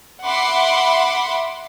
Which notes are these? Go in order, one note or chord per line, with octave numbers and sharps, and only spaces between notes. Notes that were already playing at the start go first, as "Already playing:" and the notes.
E5 F#5 B5 C6 D6